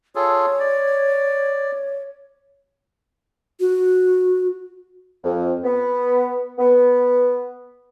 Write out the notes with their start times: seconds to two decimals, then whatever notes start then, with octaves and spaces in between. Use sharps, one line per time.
0.15 F4 G#4 A4 C#5
0.60 D5
3.60 F#4
5.24 F2
5.63 B3
6.59 B3